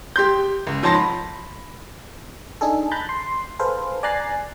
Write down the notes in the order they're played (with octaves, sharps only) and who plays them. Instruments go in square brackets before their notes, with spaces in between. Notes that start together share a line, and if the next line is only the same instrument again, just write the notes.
[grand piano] G4 C6 G6
C#2
G#2 F3 C#5 A5 C6 A#6
B5
[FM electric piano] D4 D#4 G#4 A4
A#5 B5 F#6 G6 A6
C6
G#4 A4 B4 C5 F5
D5 G#5 A#5 F#6 A6 C7